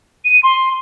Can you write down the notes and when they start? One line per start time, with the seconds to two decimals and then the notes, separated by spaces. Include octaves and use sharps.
0.25 D#7
0.43 C6